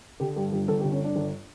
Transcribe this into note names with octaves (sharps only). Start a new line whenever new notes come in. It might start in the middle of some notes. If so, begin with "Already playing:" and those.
D3 G4
G2 G4
G1 G4
G1 A4
G4
D3
C#4
G2 D4
G1